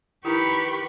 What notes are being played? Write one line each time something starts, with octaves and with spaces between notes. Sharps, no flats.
D#3 E4 G4 B4 B5 C#6